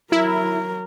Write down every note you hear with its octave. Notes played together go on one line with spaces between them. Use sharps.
F#3 E4 A#4